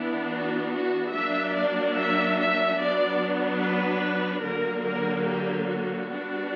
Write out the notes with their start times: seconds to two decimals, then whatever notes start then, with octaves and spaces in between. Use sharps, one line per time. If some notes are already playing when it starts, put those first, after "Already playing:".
Already playing: E3 B3 D4 E4
0.32 F#4
0.73 F#4
1.14 F#3 A#3 D4 E5
1.55 D5
1.96 E5
2.37 E5
2.78 F#3 B3 D4 D5
3.61 B4
4.42 D3 F#3 A#3 A#4
4.84 A#4
5.25 G4
5.67 F#4
6.08 G3 B3 D4